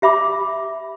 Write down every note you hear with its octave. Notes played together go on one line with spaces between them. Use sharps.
G4 E5 B5 D6